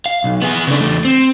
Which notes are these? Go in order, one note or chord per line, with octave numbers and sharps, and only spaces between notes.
F5
B1
B3 G#4
C#3 D4
E2 A3
C4